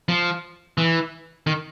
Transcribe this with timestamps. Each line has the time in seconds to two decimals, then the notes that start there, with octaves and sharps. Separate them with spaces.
0.09 F3
0.78 E3
1.47 D#3